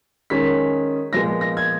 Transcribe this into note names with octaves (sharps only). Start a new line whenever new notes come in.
D#3 G#3 C#4 B6
A#2 F3 G#3 B3 A#6
A#6
G#6